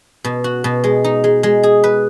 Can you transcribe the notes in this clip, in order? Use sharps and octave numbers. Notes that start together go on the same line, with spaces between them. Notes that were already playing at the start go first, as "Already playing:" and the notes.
B2
F#4
B2
G#3
D#4
G#3
G#3
G#4
B4